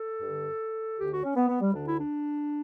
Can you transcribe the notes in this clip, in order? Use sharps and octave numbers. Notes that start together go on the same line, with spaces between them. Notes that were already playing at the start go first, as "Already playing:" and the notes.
Already playing: A4
G2 D3
D2 D3 G4
F#4
C#4
B3
B3
G3
D2 D3 D4
E4
D4